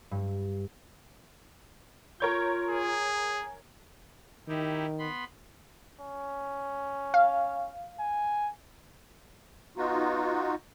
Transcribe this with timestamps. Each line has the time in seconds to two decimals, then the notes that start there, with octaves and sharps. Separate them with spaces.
0.11 G2
2.20 F4 A#4 C#5 G6
2.70 G#4
3.27 G#5
4.48 D#3 D#4 E4 G4
4.99 B3 B5 C6
6.01 C#4
7.14 F5
8.00 G#5
9.77 B3 D#4 F4 F#4